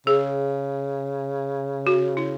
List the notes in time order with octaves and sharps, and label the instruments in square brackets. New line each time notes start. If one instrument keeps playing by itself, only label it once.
[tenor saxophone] C#3 [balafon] G#4
[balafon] F#4
E4